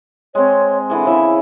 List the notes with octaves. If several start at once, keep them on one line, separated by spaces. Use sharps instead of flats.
G#3 C4 C#5
D3 E3 G#4
C#3 E4 E5